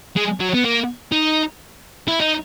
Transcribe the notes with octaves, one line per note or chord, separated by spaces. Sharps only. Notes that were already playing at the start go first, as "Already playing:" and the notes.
G#3
F#3
B3
A#3
D#4
E4
D#4